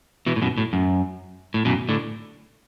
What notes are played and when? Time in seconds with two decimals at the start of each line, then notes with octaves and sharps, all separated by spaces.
0.26 B2 E3
0.36 A2
0.42 F#2 B2
0.58 A2
0.73 F#2
1.54 A2
1.65 F#2 B2
1.89 A2 D3